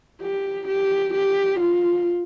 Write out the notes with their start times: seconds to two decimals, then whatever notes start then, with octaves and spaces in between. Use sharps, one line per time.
0.22 G4
0.68 G4
1.14 G4
1.60 F4